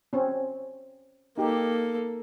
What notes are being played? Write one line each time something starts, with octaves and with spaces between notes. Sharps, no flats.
C4 C#4
A#3 D#4 G4 A4